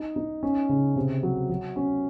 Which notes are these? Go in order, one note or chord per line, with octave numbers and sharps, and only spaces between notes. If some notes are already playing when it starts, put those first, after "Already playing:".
Already playing: D#4
D#4
C#4
C#3
C3
F#3
F#3
C#4